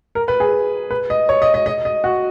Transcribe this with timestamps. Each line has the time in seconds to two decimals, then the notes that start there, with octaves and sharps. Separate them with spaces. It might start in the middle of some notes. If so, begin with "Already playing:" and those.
0.15 A#4
0.28 B4
0.40 G#4
0.91 B4
1.10 D#5
1.29 C#5
1.42 D#5
1.54 D#5
1.66 D#5
1.85 D#5
2.04 F#4